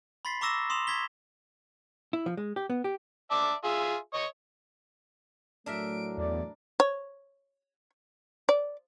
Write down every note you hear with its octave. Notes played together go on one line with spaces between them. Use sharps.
B5 C6 A6 B6 C7
A#5 C#6 D6 E6 A#6 E7
C6 D#6 E7 F7
C#6 G#6 B6 G7
E4
F3
G#3
G4
B3
G4
D5 E5 A5
F4 G#4 E5
C#5 D#5 C#6
A2 F#3 A3 D4 A#4 E5 D7
E2 D5
C#5
D5